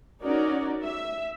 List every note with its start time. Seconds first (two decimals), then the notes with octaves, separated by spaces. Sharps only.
0.21 C#4 D#4 F#4 A#4 D5
0.83 E5